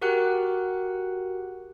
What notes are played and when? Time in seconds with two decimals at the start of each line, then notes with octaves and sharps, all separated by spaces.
0.01 F#4 G4 A#4 F#5 D6 F#6